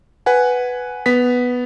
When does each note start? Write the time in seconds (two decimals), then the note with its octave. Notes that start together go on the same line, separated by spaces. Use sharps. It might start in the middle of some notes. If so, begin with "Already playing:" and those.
0.26 B4 F#5 G#5
1.06 B3 B6